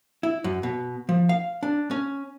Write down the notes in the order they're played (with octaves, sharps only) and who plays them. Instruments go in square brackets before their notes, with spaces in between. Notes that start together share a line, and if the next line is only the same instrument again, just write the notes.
[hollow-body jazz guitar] E4
F#2
B2
F3
F5
D4
C#4